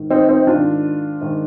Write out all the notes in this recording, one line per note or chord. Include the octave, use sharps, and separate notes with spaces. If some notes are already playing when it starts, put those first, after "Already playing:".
Already playing: G#2 D#3
C4 D#4
C4 D#4
G#2 D#3 D4 F4
G#2 D#3